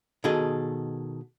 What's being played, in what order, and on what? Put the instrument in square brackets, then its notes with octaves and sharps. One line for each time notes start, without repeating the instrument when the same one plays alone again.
[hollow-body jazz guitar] B2 D#3 G#4 A4 D#5